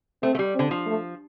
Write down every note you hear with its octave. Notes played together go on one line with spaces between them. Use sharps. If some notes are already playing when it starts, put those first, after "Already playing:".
A3 C4
A3
G3
D3 C4
F3
A3